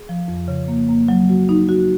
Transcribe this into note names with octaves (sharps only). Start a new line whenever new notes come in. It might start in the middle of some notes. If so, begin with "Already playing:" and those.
Already playing: G#4
F3
F2
C#3
A#3
A#3
F#3
F#4
D#4
F#4